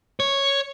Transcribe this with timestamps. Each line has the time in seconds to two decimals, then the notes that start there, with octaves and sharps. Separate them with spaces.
0.20 C#5